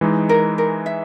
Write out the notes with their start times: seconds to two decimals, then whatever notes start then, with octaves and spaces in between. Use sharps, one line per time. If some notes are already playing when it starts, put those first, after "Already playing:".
0.01 E3 G#3 D#4
0.29 A#4
0.58 A#4
0.86 E5